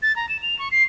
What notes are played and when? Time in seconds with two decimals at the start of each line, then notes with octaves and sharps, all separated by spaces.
0.02 A6
0.16 A#5
0.29 E7
0.42 F7
0.59 C#6
0.71 C7